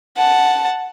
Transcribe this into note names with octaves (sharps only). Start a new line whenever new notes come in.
F#5 A5